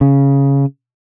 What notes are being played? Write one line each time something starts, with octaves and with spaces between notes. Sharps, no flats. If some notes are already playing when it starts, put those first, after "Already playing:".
C#3